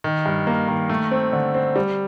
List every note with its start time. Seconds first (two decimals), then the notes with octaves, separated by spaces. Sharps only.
0.04 D#3
0.26 G2
0.47 A#3
0.68 D#3
0.89 A3
1.11 C4
1.33 D3
1.54 C4
1.76 G3